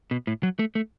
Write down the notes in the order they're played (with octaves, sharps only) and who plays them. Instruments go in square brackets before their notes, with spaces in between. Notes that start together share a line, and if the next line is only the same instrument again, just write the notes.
[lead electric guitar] B2
A2
F#3
A3
A3